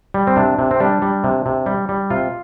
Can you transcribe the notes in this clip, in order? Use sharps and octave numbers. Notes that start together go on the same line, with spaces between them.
G3
C4
C3 D4
C3
C4
G3 D4
G3
C3
C3
G3
G3
C3 F4